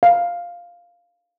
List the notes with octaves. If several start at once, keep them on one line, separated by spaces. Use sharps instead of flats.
F5